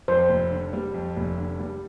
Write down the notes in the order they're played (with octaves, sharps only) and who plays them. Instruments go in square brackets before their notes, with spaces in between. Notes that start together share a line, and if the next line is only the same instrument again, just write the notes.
[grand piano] F2 [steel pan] C5
[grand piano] F1
D3
G3
F2
F1
D3
G3